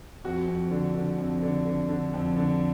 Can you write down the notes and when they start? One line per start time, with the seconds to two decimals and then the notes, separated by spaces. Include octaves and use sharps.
0.24 F2 F#4
0.48 F2
0.71 D3
0.95 D3
1.18 F2
1.42 D3
1.65 D3
1.89 D3
2.14 F2
2.36 D3